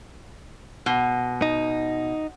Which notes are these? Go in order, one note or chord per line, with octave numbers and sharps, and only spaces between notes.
B2
D#4